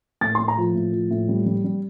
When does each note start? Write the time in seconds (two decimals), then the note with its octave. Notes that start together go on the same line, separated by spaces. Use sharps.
0.21 A2 A6
0.35 A2 C6
0.48 A#5
0.57 F3
0.75 A2
0.93 F3
1.11 A2
1.29 G3
1.46 G3
1.64 G3